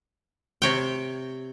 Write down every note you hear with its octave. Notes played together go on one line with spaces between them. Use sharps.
C3 C#5 G5